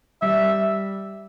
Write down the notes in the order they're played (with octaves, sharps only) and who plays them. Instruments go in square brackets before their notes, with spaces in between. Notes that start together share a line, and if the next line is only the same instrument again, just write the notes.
[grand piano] G3 [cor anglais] E5